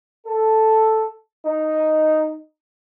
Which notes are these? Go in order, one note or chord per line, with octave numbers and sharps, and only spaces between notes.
A4
D#4